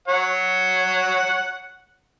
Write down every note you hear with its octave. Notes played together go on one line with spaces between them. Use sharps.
C#5 F#5